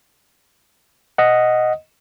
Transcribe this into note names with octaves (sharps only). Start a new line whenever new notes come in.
D#5 F#5